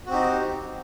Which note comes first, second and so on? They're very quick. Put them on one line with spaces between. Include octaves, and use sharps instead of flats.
F#4 C4 G4 D#4